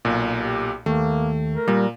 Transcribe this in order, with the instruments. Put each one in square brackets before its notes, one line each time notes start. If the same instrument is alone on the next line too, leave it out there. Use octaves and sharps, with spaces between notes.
[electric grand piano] B1 A#2
[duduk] G4
[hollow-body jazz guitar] D#2 [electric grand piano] A3 [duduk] A#3
[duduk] A#4
[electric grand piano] A#2 [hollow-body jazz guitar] G3